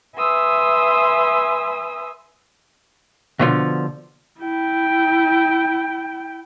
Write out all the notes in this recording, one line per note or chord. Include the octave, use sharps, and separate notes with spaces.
B4 E5 G#5 C6 D#6 E6
B2 D3 F3
E4 G5